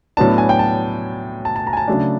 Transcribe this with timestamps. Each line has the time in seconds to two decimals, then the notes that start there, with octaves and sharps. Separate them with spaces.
0.17 A2 F#3 B3 D4 A5
0.38 G#5
0.49 G5
0.59 A5
1.45 A5
1.56 A5
1.67 A#5
1.73 G#5
1.77 A5
1.88 C#3 F#3 A3 D4